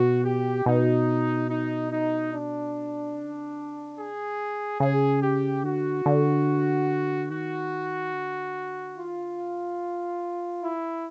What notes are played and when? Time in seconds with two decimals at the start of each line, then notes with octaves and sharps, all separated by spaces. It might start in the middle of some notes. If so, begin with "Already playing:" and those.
Already playing: B2 F#4
0.24 G4
0.65 B2 D#4
1.48 D#4
1.90 D#4
2.32 D4
3.14 C3
3.25 C#3
3.35 C3
3.98 G#4
4.80 C#3 G#4
5.22 G4
5.63 D3 F#4
6.06 D3
7.30 D#3 F#4
8.13 D3
8.97 D#3 F4
9.17 D3
9.38 C#3
9.58 C3
9.79 A2
10.21 G#2
10.62 A2 E4
10.82 A#2